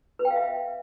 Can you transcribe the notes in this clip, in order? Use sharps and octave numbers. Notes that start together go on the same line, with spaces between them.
B4
G5
F5
E5